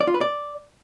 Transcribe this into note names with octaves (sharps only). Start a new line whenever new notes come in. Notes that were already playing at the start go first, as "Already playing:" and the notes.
D5
F4
B4
D5